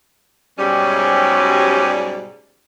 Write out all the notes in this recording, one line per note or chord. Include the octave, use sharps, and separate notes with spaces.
G#2 B2 F#3 G3 C#4 G4